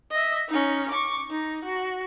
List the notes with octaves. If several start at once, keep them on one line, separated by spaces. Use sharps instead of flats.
D#5 E5
C#4 D#4
C#6 D6
D#4
F#4